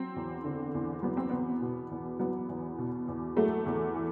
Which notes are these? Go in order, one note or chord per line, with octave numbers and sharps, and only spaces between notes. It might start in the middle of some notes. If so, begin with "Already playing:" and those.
Already playing: F#3 C4
E2
D3
E2
F#3 B3
C4
E2 B3
B2
E2
F#3 B3
E2
B2
E2
F#3 A3
E2
E3